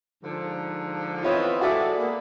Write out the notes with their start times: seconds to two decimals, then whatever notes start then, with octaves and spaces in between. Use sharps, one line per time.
0.23 G#2 D3 F3
1.23 E3 B3 C4 F4 C#5 D#5
1.61 G#3 F#4 A4 D5 E5
1.97 A#3 B3